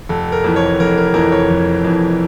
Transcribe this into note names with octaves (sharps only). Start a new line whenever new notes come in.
F1 A4
A#4
F2 E3
C#5
F1 A#4
A#4
F2 E3 A#4
C#5
F1
F2 E3